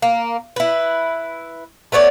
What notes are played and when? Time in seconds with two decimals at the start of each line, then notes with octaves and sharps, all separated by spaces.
0.02 A#3
0.56 E4 B4
1.92 A3 B3 C#5 D5